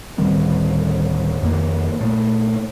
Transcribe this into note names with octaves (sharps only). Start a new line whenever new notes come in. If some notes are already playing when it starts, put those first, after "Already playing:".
D1 D#3 G3 C4
F2 D#3 A#3
A#2 A3